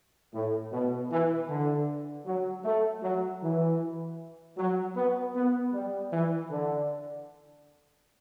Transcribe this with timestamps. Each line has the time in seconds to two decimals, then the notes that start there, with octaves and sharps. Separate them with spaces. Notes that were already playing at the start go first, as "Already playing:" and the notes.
0.33 A2
0.72 B2
1.10 E3
1.49 D3
2.26 F#3
2.65 A3
3.03 F#3
3.42 E3
4.57 F#3
4.96 B3
5.35 B3
5.74 G3
6.12 E3
6.51 D3